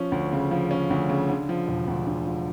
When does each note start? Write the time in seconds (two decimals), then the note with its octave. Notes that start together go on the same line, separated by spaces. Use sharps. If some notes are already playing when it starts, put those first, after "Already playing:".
Already playing: F3 C#4
0.12 D2
0.33 C#3
0.51 F3
0.71 C#4
0.90 D2
1.09 C#3
1.29 D3
1.49 F3
1.68 E1
1.88 D2
2.07 D3
2.27 F3